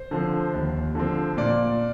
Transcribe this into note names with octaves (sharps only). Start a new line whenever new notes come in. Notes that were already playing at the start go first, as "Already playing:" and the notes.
Already playing: C5
D3 F3 C4
D#2
D3 F3 C4
A#2 D5